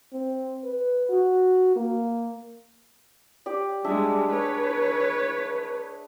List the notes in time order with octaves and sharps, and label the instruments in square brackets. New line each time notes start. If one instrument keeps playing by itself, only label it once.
[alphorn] C4
B4
F#4
A#3
[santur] G4 D5
[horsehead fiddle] G3 G#3 [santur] D4 G#4 E5
[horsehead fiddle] B4 C#5